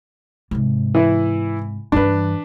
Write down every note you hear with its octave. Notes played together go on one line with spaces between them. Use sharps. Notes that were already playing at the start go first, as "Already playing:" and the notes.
G#2 C3
E3 E4
G2 E3 D4 B4